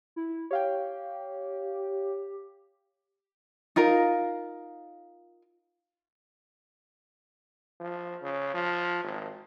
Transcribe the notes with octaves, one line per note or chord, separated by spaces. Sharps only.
E4
G4 C#5 F5 G5
D#4 F4 A#4 F5
F3
C#3
F3
G#1